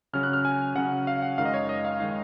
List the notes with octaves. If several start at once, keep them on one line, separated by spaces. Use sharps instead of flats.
C#3 F#3 C#4 F6
F#6
F6
G#5
C#3 F#3 C#4 F#5
F5
F#5
F#2 D#3 G#3 D#4 F5
D#5
C#5
D#5
F5
D#3 G#3 D#4 F5